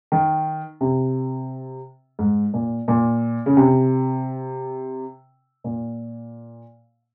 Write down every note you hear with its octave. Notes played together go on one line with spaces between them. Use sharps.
D#3
C3
G#2
A#2
A#2
C#3
C3
A#2